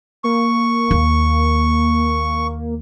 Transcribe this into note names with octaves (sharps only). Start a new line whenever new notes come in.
A#3 C#6
D#2